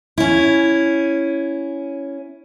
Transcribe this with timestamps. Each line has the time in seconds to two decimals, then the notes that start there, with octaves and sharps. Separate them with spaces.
0.18 C#4 E4